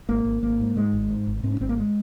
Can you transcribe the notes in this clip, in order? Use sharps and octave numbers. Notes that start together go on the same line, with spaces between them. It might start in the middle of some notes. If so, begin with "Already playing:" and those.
G#1 A#3
G#1
G#1 A#3
G#2
G#2 G#3
G#1
G#2
G#1
G#2 C4
C#4
G#1 C4
A#3
G#3